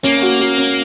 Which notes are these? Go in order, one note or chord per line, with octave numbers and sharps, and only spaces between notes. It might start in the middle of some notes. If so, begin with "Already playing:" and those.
A#3 C#4
F#4
F#4
C#4